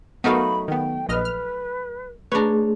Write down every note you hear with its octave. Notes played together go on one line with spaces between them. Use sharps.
F#3 A3 B3 D#4 A#4 F5 B5
D#3 B3 G5
A#1 B4 D#5 F6
F6
A3 D4 G#4 B4 C#5 A#5